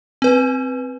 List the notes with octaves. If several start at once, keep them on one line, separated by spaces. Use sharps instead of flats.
C4 B4